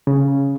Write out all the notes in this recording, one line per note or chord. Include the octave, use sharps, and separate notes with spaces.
C#3